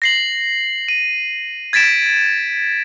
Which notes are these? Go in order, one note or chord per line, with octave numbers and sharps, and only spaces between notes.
A#6 C7 F#7
D#7
G#6 A6 B6 D7 E7